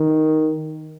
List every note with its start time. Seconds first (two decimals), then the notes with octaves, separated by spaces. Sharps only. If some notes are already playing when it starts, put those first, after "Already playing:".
Already playing: D#3